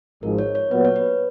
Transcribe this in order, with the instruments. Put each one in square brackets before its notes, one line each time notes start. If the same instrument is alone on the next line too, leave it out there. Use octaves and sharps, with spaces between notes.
[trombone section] G#1 G#2 F3 G#3 [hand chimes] A#4
[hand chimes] C#5
C#5
[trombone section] A#2 F#3 B3 [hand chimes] B4
[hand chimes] C#5
B4